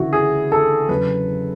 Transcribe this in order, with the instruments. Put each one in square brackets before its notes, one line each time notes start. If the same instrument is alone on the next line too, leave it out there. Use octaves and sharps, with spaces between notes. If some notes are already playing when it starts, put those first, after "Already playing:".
Already playing: [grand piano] D2 C#3 E3 A3 E4 F#4
G#4
A4
E2 C#3 F#3 B4